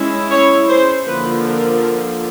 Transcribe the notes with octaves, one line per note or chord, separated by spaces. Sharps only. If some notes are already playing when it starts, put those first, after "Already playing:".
Already playing: G#3 C#4 E4
C#5
C5
D3 F3 A#3 B4
A#4